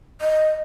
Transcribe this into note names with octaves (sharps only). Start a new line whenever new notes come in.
D#5